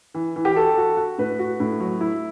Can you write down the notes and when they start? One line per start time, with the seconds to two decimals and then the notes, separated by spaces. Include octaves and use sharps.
0.14 E3
0.36 E3
0.45 G4
0.56 F#4 A4
0.78 F#4
0.97 F#4
1.18 A2 B4
1.39 F#4
1.60 A2
1.80 F#3
2.01 E4